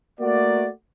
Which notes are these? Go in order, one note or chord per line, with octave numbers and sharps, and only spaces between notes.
A3 A#3 F#4 D5